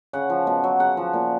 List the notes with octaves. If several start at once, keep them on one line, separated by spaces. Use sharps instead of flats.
C#3 F#5
F3
B2
F#3
C#3 F#5
F3
A#2